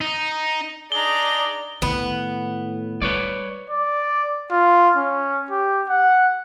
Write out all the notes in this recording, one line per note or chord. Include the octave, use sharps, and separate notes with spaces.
D#4
D4 D#4 G#4 D5 A#5 G7
A2 D#3 B3 C#4
G3 B4 C#5 D5
D5
F4
C#4
G4
F#5